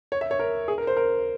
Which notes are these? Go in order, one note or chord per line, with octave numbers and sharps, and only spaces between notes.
C#5
E5
C#5
A#4
G#4
A#4
C5
A#4